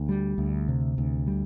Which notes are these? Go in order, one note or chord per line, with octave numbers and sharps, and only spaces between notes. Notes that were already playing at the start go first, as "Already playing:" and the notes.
Already playing: D2
G3
D2
C3
D2
G3